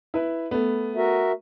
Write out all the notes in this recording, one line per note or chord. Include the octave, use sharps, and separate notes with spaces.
E4 B4
A3 B3
F#4 A#4 E5